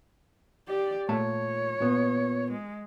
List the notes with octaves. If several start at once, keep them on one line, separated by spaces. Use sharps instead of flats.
G4 D5
A#2 A3 C#5 A5
A#2 B3
G#3